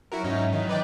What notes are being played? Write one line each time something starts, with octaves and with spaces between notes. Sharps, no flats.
F#3 E4 F#4 A#4
G#2 C#4 D#4 E5
D#3 E3 D#5
F#3 D4 D#4 B4 D5 G5